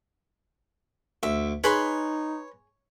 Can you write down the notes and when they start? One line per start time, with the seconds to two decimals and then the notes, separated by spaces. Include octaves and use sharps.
1.23 D2 E5
1.64 D#4 G#4 B4 C#5 B5 C6